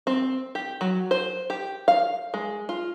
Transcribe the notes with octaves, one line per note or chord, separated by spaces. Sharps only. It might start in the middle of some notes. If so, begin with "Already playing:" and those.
C4
G4
F#3
C5
G4
F5
G#3
F4